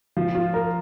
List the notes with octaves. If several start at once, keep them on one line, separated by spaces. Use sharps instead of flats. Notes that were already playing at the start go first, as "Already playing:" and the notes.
F3
F4
A#4